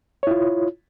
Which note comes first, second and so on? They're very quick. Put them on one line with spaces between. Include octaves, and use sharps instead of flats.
C#5 E4 F4